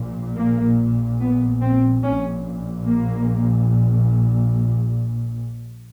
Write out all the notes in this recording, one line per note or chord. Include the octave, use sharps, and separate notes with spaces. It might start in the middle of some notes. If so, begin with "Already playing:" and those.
Already playing: A#1 A#2
A#3
B3
C4
A#1 A#2 C#4
A#3